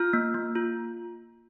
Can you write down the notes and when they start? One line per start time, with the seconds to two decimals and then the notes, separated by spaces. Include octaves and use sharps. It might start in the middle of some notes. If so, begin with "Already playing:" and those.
Already playing: F4 F6
0.13 A#3
0.34 A#3
0.55 F4